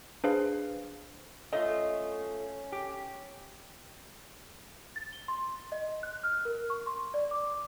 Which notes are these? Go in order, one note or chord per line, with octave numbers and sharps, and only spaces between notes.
D4 G#4 B4 C5 F5
A3 C#4 F4 D#5
G4
A6
G7
C6
D#5
F#6
F6
A#4
C#6
C6
D5
D6